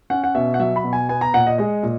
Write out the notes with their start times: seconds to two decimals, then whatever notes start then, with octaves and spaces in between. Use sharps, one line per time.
0.10 C#4 F#5
0.24 F#5
0.35 B2 E5
0.54 F#5
0.59 F#3 E5
0.76 B5
0.84 B2
0.93 G#5
1.09 B3 G#5
1.21 A#5
1.34 A#2 F#5
1.47 D#5
1.58 G#3 D#5
1.83 A#2